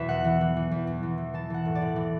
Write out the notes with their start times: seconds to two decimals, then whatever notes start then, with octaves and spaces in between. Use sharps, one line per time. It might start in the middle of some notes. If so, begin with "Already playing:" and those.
Already playing: E2 B2 B4 E5
0.09 E3 F#5
0.25 E3
0.41 E3
0.56 E3
0.71 E2
0.87 E2
1.03 E3
1.18 E3
1.33 E3 A5
1.50 E3 F#5
1.65 A2
1.75 D5
1.81 A2
1.96 E3